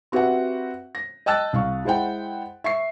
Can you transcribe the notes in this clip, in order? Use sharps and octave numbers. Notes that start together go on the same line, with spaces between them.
C4 F#4 G4 B4 E5 F#5
A#6
D#5 G5 A5 E6 F#6 A6
C2 F5 C#6
G#3 E4 C5 F#5 G5
E5 C#6 C7